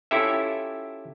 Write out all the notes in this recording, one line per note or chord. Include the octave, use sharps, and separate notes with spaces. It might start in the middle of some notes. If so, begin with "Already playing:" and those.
C#4 E4 F4 G4 A4 E5